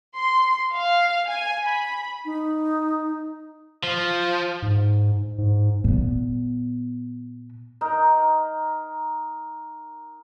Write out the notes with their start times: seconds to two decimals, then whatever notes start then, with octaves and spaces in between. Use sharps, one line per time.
0.15 C6
0.75 F5
1.30 G#5
1.66 B5
2.25 D#4
3.83 F3
4.62 G#2
5.38 G#2
5.84 A#2 B3
7.81 D#4 A#4